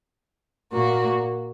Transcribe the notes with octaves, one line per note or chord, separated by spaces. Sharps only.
A#2 A#3 F#4